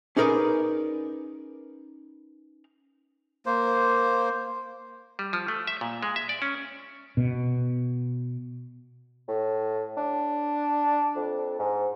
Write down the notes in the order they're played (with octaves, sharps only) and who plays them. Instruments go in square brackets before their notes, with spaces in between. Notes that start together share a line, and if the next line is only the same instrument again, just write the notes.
[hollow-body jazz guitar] C#4 D#4 G#4 A#4 B4 D5
[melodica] A#3 C5
[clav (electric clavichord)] G3
F3
A3
E5
A#2
G#3
E5
D5
C#4
[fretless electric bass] B2
[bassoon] A2
D4
F2
G#2